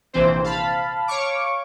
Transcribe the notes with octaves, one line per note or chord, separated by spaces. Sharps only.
A#1 C3 E3 C4 C5
F5 A5 B5
C#5 F5 C#6 D6